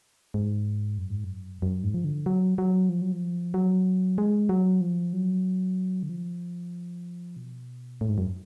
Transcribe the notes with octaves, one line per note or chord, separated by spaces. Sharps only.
G#2
F#2
G#2
F#2
F#2
G#2
F3
D3
F#3
F#3
F3
F#3
F3
F#3
G#3
F#3
F3
F#3
D3
F3
B2
A2
G#2
F#2